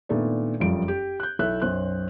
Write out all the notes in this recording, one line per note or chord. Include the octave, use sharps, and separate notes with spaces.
A#2 D#3 A3 B3 D4
F#1 F2 G3 F4 D7
G4
F#6 G6
B1 E4 A4 E5 F#6
B1 F#2 C5 F#6